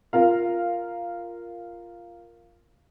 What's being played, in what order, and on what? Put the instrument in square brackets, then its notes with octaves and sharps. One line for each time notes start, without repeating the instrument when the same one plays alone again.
[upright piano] F4 A#4 F5